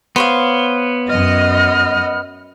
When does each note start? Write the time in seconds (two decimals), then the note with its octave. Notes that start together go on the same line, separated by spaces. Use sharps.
0.16 B3 C5 C#5 F5 G7
1.09 F#2 D#5 F6